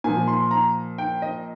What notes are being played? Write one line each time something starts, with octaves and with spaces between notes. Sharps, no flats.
A#2 F3 G#5
C6
A#5
G5
D#5